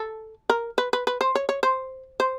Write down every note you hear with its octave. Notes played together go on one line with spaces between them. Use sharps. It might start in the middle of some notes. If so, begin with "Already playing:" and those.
Already playing: A4
A#4
B4
B4
B4
C5
C#5
C#5
C5
C5